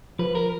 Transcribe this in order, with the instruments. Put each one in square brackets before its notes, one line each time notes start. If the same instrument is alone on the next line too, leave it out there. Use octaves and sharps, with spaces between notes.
[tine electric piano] F3 [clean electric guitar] B4
[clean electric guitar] A#4